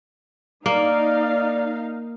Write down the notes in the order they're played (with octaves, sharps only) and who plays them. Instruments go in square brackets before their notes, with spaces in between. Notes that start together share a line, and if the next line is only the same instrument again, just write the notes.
[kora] A#3 [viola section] D#4 F5 [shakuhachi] D5